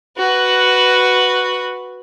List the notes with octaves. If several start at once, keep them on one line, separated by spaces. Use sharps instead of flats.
F#4 B4